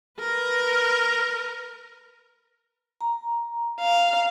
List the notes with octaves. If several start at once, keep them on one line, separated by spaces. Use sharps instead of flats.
A#4 B4
A#5
F5